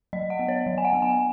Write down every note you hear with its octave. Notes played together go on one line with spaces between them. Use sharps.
F#3 D#5
F#5
B3
C#5
F#3
G#5
F#5
B3
G#5